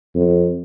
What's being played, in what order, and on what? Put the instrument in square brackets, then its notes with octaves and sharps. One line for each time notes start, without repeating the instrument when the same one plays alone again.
[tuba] F2